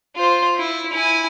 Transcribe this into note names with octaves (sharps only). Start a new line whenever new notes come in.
F4 C5
E4
E4 G#5